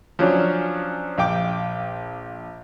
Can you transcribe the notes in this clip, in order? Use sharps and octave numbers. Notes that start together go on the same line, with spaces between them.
F3 F#3 C#4 D4
A#1 F5 G5 D6